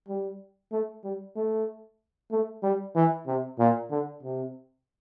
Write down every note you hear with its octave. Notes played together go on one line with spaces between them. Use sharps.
G3
A3
G3
A3
A3
G3
E3
C3
A#2
D3
C3